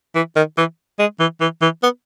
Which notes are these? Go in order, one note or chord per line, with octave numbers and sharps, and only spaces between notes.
E3
D#3
E3
G#3
E3
E3
E3
B3